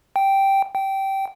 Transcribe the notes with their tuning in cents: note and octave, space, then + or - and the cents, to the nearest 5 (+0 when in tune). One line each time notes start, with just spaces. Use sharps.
G5 -5
G5 -15